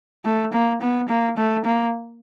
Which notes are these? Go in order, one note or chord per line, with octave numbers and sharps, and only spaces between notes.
A3
A#3
B3
A#3
A3
A#3